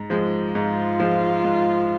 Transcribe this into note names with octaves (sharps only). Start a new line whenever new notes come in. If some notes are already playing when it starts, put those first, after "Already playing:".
Already playing: G#2
F3 G#3
G#2 F4
F3 G#3
G#2